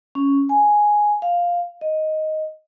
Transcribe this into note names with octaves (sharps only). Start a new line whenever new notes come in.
C#4
G#5
F5
D#5